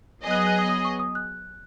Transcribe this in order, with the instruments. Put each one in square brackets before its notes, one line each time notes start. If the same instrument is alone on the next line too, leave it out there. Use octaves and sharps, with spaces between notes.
[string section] F#3 B3 G#4 D#5
[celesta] F#6
D#6
F#6
D#6
D#6
C#6
D#6
F#6